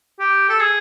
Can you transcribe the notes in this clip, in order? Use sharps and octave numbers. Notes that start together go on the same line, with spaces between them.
G4
A4
G#4